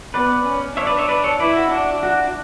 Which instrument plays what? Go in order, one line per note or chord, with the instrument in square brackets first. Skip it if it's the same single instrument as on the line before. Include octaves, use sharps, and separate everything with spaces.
[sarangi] B3 [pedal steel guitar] B4 D5
[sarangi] C#4
[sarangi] D4 [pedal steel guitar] C#5 E5
[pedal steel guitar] B4 D5
C#5 E5
B4 D5
A4 C#5
[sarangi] E4 [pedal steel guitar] B4 D5
[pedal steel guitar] F#4
[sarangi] D4
[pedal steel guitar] F#4